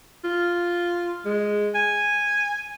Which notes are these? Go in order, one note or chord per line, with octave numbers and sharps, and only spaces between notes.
F4
G#3
G#5